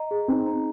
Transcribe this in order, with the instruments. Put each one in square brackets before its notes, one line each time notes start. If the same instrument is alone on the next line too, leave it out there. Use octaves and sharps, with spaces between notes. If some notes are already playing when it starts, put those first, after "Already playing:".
Already playing: [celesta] D#5 A#5
G#4
[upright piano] C4 [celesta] D#4
[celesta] A#5